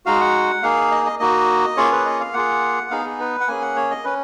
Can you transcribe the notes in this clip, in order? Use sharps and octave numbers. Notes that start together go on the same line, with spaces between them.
G#3 D#4 F#4 F5
F#5
A#3 D#4 G#4 F5
D#5
D#5
A#3 D#4 F#4 D#5
A#3 C#4 F4 G#4 C#5
B4
D#5
F5
A#3 F4 G#4 F#5
B3 D#4 G#4 F5
G#4
B4
F#5
A#3 C#4 G#4 G#5
F#5
C#5
D#5
C#4 B4